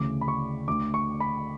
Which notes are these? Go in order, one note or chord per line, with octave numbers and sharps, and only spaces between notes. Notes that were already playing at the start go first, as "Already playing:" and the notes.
Already playing: D2 C#3 E3 D6
B5
C#6
D2 D3 D6
C#6
B5